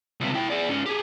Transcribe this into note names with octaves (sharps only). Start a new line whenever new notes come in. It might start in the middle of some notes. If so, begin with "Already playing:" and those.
C#2 C3
E4 G5
G#4 D5
G#2 C#4
G4 G#4